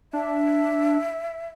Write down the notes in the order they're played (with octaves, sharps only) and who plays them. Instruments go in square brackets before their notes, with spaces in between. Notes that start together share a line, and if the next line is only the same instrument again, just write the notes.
[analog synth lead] D4 [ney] E5